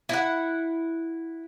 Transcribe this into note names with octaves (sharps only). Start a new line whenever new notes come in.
E4 F#5